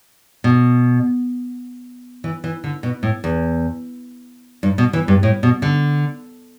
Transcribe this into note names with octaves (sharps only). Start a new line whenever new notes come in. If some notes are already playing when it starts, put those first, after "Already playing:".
B2
E3
E3
D3
B2
A2
E2
G2
B2
E3
G2
A2
B2
D3